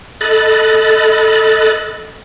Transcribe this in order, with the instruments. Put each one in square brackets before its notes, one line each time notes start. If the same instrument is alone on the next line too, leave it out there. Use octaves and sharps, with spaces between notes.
[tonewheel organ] A4 D#5 B5 F#6 A6